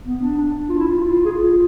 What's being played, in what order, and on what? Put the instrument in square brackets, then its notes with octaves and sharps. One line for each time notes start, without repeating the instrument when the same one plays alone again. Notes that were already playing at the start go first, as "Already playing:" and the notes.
[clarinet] B3
D4
D4
F4
E4
F4
F4
G#4
F4